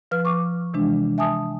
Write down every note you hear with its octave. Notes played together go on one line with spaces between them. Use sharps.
F3 B4 F6
C#6 D6
C3 E3 G#3 D4
E5 G#5 A5 D#6